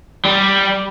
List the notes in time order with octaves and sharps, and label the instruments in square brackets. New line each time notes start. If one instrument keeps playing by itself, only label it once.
[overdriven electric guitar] G3